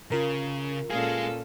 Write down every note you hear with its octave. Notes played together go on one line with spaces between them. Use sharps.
C#3 F4 A#4
A#2 G#3 C#4 G#4 A4 F5